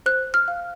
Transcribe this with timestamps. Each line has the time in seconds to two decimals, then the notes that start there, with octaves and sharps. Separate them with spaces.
0.06 C5 F#6
0.34 F6
0.48 F5